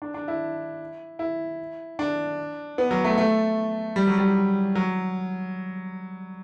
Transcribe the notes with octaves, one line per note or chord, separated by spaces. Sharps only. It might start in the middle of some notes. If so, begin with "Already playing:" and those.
D4
D4
E4
E4
D4
B3
F#3
A3
A3
G3
F#3
G3
F#3